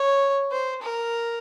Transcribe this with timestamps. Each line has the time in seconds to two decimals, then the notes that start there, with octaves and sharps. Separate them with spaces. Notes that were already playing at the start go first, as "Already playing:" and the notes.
Already playing: C#5
0.51 C5
0.82 A#4